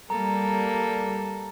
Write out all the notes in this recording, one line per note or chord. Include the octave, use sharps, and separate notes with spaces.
G3 A#3 A4 A#5